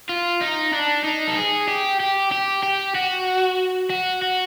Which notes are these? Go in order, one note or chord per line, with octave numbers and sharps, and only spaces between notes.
F4
D#4
D4
D#4
A4
G#4
G4
G4
G4
G4
F#4
F#4
F#4